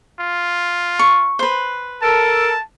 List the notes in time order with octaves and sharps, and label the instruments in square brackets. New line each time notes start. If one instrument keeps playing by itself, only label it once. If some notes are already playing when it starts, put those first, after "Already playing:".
[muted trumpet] F4
[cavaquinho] C#6
B4 C5
[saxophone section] A4 A#4 [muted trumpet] A5